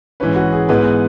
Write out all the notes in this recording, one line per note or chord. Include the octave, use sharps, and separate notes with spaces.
G#2 E3 C#4 B4
F#4
G#4
G#2 E3 G#3 B3 B4